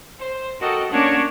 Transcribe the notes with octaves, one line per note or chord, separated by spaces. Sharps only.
C5
F#4 A4 A#4 D#5 G5
A#3 C#4 D4 C#5 F#5 A5